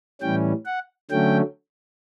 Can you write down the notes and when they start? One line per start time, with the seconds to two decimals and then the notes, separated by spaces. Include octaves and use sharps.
0.22 A2 E3 G3 C#4 G5
0.66 F#5
1.10 D3 F#3 A3 C#4 G5